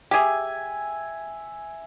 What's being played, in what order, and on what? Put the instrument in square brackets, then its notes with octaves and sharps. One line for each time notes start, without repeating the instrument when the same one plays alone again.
[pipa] G4 G#4 [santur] E5 G#5